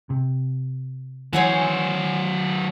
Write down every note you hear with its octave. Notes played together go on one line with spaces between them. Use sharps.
C3
E3 F#3 C5 C#5 F#5 G#5